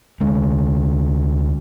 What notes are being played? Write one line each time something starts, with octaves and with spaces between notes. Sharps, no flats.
D2 G#3